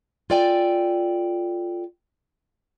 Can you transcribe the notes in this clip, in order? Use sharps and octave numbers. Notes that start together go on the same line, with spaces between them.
F4 A4 D5 G5 G#5